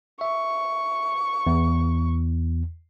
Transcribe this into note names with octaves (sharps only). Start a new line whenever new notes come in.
E5 C#6
E2